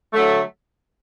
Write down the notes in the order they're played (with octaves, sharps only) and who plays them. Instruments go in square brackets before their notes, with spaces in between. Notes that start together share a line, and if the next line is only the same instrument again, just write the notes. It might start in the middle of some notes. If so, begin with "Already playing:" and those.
[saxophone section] D3 F#3 A3